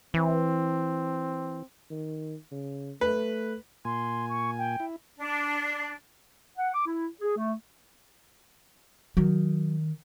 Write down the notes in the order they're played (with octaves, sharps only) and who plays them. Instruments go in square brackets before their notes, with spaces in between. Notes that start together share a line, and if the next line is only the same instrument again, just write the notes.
[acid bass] E3 [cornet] C4
[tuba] D#3
C#3
[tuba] A3 [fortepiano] B4
[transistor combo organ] A#2 G#5 [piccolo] C6
[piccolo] C#6
G5
[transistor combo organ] E4
[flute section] D4
[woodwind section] F#5
D6
E4
G#4
A3
[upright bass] D#3 [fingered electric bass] F#3